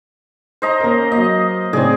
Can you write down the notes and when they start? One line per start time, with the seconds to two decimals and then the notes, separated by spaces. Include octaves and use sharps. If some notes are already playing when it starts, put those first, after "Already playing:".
0.62 C5 D#5 A#5
0.80 A#3 C#4 A#4
1.12 F#3 A#3 D#5
1.73 A2 C#3 C4 G#4 D5 G#5